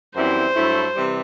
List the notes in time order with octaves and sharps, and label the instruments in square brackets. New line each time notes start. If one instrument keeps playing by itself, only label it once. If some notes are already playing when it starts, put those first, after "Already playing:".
[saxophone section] F#2 E3 G3 C4 E4 [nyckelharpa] C5
[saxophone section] G2 F#3 A3 E4
C3 E3 G3